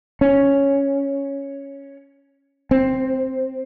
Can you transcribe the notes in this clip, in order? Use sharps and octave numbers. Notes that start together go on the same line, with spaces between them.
C#4
C4